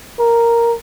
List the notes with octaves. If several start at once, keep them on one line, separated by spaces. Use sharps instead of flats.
A#4